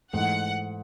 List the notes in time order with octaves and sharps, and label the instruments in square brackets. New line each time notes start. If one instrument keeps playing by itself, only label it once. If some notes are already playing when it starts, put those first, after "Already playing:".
[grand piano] G#2 E3 A3 [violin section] F#5